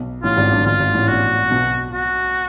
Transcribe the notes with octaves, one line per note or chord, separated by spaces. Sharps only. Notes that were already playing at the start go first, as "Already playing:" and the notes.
Already playing: B1 B2
A1 A2 F4
G#1 G#2
G1 G2
G#1 G#2 F4
G#1 G#2
A1 A2
A#1 A#2 F#4
B1 B2
F#4